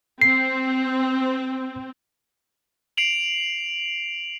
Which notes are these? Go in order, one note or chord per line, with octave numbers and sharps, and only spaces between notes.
C4 C7
C7 D7 F7 F#7